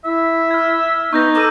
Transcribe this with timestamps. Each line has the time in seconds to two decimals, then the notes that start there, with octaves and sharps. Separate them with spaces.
0.05 E4 E5
0.51 F6 G#6
1.13 B3 D#4 C#6 G6 A#6
1.35 A4 A#5 D6 E6 D#7